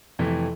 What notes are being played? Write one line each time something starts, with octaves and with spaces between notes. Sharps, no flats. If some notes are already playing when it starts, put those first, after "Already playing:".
F2 C3 E3 A3